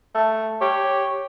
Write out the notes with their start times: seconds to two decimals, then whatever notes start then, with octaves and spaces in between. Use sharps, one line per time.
0.15 A3
0.61 G4 C#5